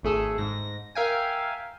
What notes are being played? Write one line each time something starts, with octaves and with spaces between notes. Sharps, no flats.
G#1 A3 G#4 A4
G#2 A#6
A#4 E5 F5 G5 G#5